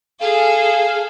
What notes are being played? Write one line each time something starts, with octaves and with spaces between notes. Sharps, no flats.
G#4 A4 F5